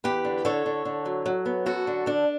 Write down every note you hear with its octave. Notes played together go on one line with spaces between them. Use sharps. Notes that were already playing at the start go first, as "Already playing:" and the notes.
E2 G4 B4
D3
D3 A4 C#5
D3
D3
F#3
F#3
B3
F#2 F#4 A4
D3
D3 D4